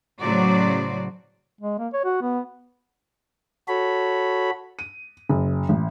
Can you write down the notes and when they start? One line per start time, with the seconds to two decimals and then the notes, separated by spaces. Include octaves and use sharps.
0.20 A2 C#3 F#3 F#4 C5 D5
1.61 G#3
1.78 A#3
1.93 C#5
2.05 F#4
2.21 B3
3.68 F#4 A4 C#5 B5
4.79 D#7
5.29 F#1
5.69 A1